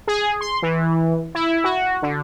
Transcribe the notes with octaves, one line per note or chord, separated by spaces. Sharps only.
G#4
C6
E3
E4
F#4
D3